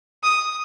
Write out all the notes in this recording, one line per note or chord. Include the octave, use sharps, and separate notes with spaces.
D#6